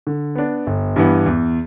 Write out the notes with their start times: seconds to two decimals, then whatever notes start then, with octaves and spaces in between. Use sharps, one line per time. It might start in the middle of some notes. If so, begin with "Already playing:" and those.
0.07 D3
0.35 B3 D4
0.67 G1
0.96 G2 E3 B3
1.26 E2